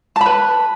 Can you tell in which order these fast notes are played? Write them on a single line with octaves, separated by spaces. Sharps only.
A5 B5 B4